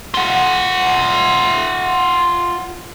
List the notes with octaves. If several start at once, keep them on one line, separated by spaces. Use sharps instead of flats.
F4 F#5